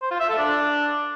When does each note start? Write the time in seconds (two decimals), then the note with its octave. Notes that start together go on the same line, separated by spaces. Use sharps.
0.02 C5
0.11 F4
0.20 E5
0.29 A4
0.38 D4